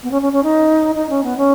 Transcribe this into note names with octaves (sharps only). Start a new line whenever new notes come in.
B3
C#4
C#4
C#4
D#4
D#4
C#4
B3
C#4